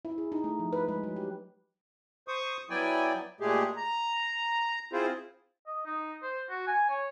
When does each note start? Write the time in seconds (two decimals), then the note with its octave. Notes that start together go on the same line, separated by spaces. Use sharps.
0.05 E4
0.18 G#4
0.32 D#4
0.44 A3
0.59 F3
0.73 B4
0.88 G#3
1.03 F#3
1.16 G4
2.28 C5 C#6 D#6
2.70 F#3 B3 E4 D5 G5 G#5
3.40 A#2 G#3 A3 G4 G#4
3.77 A#5
4.93 C4 E4 F4 G#4 C5
5.67 D#5
5.86 D#4
6.22 C5
6.49 F#4
6.67 G#5
6.89 C#5